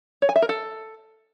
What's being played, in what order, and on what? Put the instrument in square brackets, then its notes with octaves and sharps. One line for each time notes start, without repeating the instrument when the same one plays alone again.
[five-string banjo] C#5
G#5
E5
A#4
A4